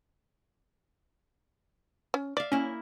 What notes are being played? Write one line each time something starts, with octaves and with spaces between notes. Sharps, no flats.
C#4
D5 E5 F5
A#3 C#4 E4